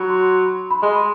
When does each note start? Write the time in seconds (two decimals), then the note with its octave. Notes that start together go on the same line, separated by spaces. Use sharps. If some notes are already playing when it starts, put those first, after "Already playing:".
Already playing: F#3 B5
0.10 C6
0.46 B5
0.71 B5
0.82 G#3 C6